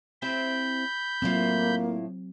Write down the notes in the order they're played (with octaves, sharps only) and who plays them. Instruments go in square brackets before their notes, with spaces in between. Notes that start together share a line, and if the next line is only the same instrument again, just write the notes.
[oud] C4 E4 G4 [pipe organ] B5 G6
[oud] A2 E4 F4 [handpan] F#3 C4 [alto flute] A#3